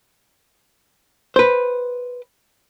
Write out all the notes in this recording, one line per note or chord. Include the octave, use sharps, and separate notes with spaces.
B4 C5